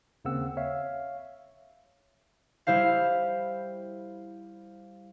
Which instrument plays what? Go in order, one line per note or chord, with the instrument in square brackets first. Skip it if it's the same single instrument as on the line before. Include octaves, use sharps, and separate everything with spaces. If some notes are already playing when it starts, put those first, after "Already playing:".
[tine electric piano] D#2 C#3 A#3 C4 F#5 E6
C#5 E5 F5
[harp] G3 E4 C5 F5